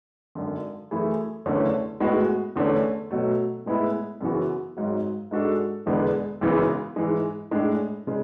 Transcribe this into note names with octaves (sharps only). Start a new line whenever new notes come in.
G#1 F#2 D3
F#2 E3 A3 E4 G#4
F#1 E2 D3 A3 C#4
A2 G#3 B3 F#4
E2 D3 A3 C#4
B2 F#3 A3
A2 G#3 B3 E4
F#2 C#3 E3 B3 F#4
G#1 G#2 F#3
G#2 G#3 D4 F#4 A4
E1 E2 D3 G#3 B3
G#1 F#2 C#3 E3 B3
G#2 E3 G#3
A2 G#3 D4
C#3 G#3